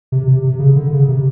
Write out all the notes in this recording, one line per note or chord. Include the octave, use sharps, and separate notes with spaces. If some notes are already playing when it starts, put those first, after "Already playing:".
C3
C3
C3
C#3
D3
C#3
C3